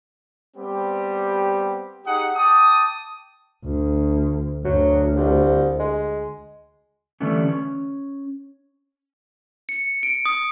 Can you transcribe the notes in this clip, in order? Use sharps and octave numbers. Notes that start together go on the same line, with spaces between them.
G3 B3 C4 G4
D#4 G4 G#4 F#5 D#6
G5 A5 D6 D#6
D2
D2 F#3
C2
G#3
D3 E3 G3 A3 B3 C#4
C#4
C#7
D7
D#6